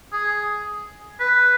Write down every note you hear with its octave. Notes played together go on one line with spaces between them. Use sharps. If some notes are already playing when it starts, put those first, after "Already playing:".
G#4
B4